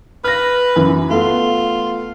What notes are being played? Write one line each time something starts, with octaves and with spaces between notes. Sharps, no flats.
B4 F6 A#6
F#2 E3
A3 B3 F4